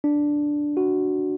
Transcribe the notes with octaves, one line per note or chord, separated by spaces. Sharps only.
D4
F#4